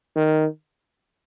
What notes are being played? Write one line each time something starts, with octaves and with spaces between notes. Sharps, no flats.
D#3